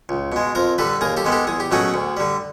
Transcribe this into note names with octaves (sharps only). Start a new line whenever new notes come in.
C#2
B2 G#3
F2 A#4 C5
D3 G3 A4 B4
D#2 G#4 A#4
G4 A4
D#3 G#3 B3
G4 A4
E2 G#4
G4
B2 F#3 A3 C#4 F#4 G#4
D2
D3 G3